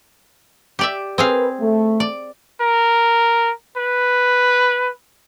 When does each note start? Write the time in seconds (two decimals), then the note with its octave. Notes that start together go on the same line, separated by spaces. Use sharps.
0.79 G4 D5 E5
1.18 C4 G#4 A#4 B4 F5
1.60 A3
2.00 D5
2.61 A#4
3.77 B4